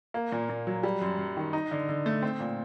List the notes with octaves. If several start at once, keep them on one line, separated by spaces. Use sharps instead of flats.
A#3
A#2
A#2
F#3
G3
F#2
F#2
D#3
D#4
D3
D3
A3
C4
A#2